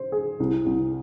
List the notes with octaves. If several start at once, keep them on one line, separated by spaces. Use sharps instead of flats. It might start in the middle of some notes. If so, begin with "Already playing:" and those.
Already playing: C5
G#4
C2
C2